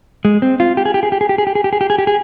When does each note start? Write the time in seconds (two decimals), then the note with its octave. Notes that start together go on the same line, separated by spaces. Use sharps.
0.25 G#3
0.42 C4
0.60 F4
0.77 G4
0.85 G#4
0.94 G4
1.03 G#4
1.12 G4
1.21 G#4
1.29 G4
1.38 G#4
1.47 G4
1.55 G#4
1.64 G4
1.73 G#4
1.81 G4
1.90 G#4
1.99 G4
2.07 G#4